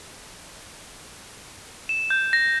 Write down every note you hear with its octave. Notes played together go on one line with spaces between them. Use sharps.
E7
G6
A#6